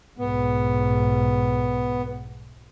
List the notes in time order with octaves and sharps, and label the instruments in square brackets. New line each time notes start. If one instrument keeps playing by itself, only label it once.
[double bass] B1 G#2 [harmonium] B3